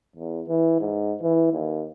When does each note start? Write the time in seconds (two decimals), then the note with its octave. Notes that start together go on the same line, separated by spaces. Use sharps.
0.16 E2
0.48 E3
0.80 G#2
1.22 E3
1.53 D#2